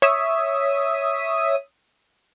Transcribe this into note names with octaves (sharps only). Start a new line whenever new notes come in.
C#5 E5 D#6